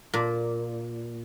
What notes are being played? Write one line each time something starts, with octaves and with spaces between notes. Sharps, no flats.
A#2